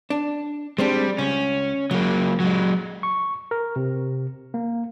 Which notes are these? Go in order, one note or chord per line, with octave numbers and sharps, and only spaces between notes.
D4
G3 G#3 C4 D4
C#2 C#4
C#2 F#3 A#3
F#3 G#3
C#6
A#4
C3
A#3